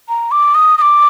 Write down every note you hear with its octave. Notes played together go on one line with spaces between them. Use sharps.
A#5
D6
D#6
D#6
D6